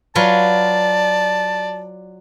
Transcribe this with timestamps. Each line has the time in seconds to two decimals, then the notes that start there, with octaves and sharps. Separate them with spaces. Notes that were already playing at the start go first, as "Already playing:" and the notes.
0.15 F#3 F4 B4 D5 A5